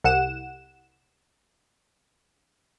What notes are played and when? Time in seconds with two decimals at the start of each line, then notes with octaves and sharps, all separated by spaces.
0.04 C2 F#5 E7